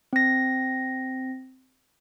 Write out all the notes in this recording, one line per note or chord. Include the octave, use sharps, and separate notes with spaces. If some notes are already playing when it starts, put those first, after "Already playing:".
C4 A#6